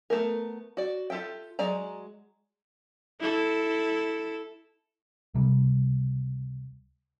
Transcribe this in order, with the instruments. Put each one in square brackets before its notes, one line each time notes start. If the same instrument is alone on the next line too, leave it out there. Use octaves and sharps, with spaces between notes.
[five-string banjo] A3 B3 A#4
F#4 D5
F4 G4 A4 E5 G5
F#3 G#3 D5 A#5
[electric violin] E4 A4
[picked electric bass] C#2 C3 G3